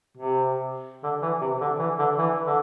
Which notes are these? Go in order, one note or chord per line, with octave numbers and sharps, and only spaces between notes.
C3
D3
E3
C3
D3
E3
D3
E3
D3